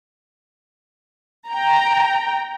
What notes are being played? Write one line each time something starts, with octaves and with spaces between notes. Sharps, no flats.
G5 A#5